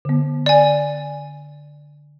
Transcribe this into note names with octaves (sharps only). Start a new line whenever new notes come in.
D3 B3
D5 G#5